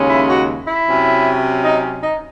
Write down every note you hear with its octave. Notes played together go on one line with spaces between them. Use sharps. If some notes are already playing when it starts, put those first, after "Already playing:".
Already playing: D#2 C#3 G#3 C#4
E4
F#4
E4
C3 F#3 C#4
D#4
D#4